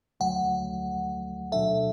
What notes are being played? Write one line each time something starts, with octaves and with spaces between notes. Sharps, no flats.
D2 D3 F#3 A3 F#5
B2 F#3 D4 A4 E5